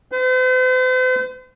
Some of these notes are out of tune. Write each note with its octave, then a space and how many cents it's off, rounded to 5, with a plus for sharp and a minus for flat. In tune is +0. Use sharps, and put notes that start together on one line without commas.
C5 -45